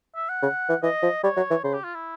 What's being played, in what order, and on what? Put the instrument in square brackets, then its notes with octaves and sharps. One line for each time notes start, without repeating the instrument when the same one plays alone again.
[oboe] E5
F#5
[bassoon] C#3
E3
[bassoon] E3 [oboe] D#5
[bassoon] F3
[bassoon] G3 [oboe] C#5
[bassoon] F#3
E3
[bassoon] C#3 [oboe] C5
[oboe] G4
F4
E4